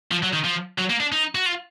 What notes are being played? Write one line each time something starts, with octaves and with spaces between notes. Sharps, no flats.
F3
F#3
D#3
F3
F#3
A#3
D4
D#4
F#4
F4